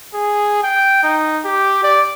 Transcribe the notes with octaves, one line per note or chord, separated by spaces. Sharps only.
G#4
G5
D#4
G4
D5